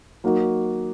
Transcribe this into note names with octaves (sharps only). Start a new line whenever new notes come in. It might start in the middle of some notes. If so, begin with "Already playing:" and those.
F#3 A#3 D#4 F#4